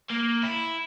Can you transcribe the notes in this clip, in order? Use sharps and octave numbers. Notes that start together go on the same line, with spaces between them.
A#3
E4